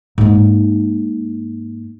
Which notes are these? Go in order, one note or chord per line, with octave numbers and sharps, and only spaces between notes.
G#2 A#3